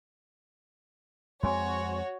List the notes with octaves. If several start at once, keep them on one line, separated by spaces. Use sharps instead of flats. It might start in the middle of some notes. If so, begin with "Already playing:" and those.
F2 G#3 C4 F#4 C#5 G#5 C6